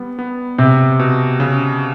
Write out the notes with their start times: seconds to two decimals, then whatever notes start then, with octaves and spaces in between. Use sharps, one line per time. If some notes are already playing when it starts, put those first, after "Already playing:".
Already playing: G3 B3
0.19 B3
0.58 C3 C4
0.99 B2
1.40 C#3